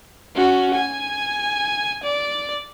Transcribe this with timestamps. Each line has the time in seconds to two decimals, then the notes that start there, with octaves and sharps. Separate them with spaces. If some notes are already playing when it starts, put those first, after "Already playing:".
0.36 C#4 F#4
0.75 G#5
2.03 D5